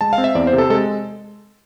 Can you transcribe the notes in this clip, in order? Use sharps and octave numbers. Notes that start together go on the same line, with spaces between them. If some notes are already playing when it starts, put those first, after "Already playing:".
G#3 A5
F5
C4
E5
E2 D5
C5
C3
A4
G#3 A4